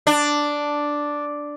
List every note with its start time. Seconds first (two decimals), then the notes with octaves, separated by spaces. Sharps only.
0.07 D4